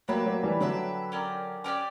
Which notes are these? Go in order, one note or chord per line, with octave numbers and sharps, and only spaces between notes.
F#3 A#3 D4 G4 B4 E5
F#3 A#3
E3 G3
D3 F#3 D4 G4 B4 E5
C#4 G4 A#4 D5
C#4 G4 A#4 D5